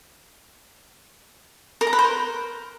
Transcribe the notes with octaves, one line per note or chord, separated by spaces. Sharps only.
A#4
A#5
B4
C5
A#4